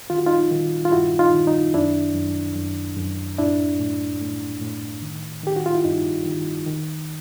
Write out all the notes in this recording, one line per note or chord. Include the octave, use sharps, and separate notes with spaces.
D#3 F4
F#4
D#4 F4
D#3
F4
G2 E4 F#4
D#4 F4
D#3
D#4
F#2 D4 E4
F#2
F#2
F#2
A2 D4 E4
A2
A2
A2
D#3
D#3 G4
F#4
F4
E4
G2 D#4
D#3
D#3